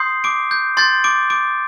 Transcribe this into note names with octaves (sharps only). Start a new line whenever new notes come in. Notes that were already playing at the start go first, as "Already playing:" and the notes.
Already playing: C6 D#6 G6 C7
D6 D7
G6
C6 G6 A6
D6 D7
D6 D7